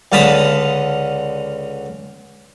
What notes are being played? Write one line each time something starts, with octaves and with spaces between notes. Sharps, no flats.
C#2 D3 F5 A5 B5 D#6